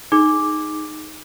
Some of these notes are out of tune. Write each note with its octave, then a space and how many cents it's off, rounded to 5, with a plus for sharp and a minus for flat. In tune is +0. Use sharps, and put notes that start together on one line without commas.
D#4 +0 G#4 +0 D6 +0